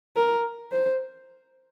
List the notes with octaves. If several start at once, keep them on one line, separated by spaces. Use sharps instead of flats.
A#4
C5